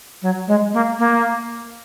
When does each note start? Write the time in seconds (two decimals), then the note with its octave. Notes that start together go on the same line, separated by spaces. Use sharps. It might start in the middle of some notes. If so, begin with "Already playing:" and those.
0.22 F#3
0.48 G#3
0.74 A#3
0.99 A#3